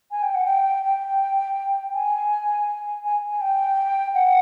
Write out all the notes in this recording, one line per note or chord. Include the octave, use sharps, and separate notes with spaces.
G#5
G5
F#5
G5
G5
G#5
G#5
G#5
G5
F#5